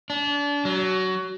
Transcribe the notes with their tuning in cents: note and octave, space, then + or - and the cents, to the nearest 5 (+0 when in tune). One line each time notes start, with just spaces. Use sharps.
D4 -30
F#3 +20